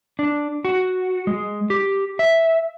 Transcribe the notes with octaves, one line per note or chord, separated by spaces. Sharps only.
D4
F#4
G#3
G4
E5